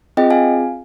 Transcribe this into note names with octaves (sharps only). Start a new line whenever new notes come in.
C4 F4 G#4 D#5 G5
F5 G#5